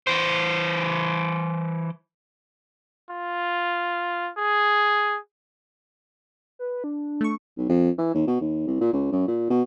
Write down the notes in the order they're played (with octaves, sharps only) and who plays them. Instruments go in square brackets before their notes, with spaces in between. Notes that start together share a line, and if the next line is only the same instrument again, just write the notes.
[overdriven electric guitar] E3 C5
[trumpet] F4
G#4
[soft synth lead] B4
D4
[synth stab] A3 C#6
[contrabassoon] B1
F2
E3
D#2
B2
D#2
C2
A#2
C#2
F#2
A#2
B2